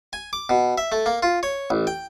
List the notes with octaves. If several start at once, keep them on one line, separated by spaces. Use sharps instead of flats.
G#5
D6
B2
E5
A3
A#3
F4
C#5
A1
G5